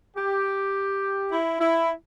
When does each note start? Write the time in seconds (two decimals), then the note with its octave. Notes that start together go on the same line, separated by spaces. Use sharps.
0.17 G4
1.32 E4
1.60 E4